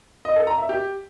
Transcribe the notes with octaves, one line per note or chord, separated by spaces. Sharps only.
D#5
A4
A#5
E5
G4